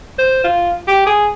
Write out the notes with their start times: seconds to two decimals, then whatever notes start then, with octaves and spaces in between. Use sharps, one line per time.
0.19 C5
0.44 F4
0.88 G4
1.07 G#4